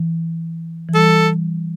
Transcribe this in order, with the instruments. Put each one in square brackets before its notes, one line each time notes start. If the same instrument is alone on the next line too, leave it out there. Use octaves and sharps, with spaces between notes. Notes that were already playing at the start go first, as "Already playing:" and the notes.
Already playing: [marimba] E3
E3
[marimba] G3 [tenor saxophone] A4